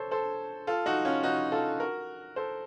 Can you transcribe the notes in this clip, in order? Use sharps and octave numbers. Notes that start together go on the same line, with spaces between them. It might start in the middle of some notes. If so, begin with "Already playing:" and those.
Already playing: A4 C5 C#5
A4 C5
F4 A4
D#4 F#4
C#4 F4
D#4 F#4
F4 A4
F#4 A#4
A4 C5